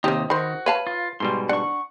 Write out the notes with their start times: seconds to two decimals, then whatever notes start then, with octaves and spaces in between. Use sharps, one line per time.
0.04 D#2 C3 A#3 D#4 G4
0.30 D#3 F#4 C5 B5
0.66 B4 C#5 F5 A5
0.87 F4
1.20 G#2 B2 G3 C6
1.49 D4 F#5 C#6